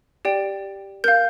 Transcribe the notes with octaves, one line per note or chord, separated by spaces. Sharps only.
G4 D5 G5
A#4 F5 G6